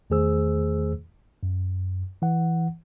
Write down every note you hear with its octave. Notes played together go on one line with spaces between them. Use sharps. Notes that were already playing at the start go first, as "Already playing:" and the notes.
E2 D#3 A3 G#4 C5 E6
F#2
E3 F#5